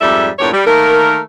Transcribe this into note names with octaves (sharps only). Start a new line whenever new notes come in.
F2 G#2 G3 A4 D5 E5
E2 G2 A#2 G4 C#5
G3
D#3 A3 A#3 A#4